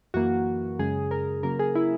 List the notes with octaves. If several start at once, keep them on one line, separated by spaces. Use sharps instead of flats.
F#2 E3 A#3 F#4
F#2 C#3 G#3 G#4
A#4
C#3 F#3 A#3 A#4
G#4
E4